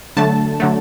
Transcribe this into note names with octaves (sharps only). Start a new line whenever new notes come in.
D3 F#3 A3 A5
D3 F#3 A3